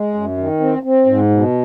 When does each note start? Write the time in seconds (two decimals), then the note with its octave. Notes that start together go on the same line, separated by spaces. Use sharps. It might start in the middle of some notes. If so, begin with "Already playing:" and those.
Already playing: G#3
0.14 F#2
0.37 D#3
0.60 C4
0.83 C4
1.06 G#2
1.30 B2